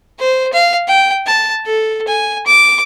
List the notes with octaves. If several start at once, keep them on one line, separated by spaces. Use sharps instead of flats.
C5
F5
G5
A5
A4
G#5
D6